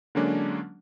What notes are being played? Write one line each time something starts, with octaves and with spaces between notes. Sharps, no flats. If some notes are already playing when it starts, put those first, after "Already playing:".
D3 F#3 G#3 A#3 C#4 D4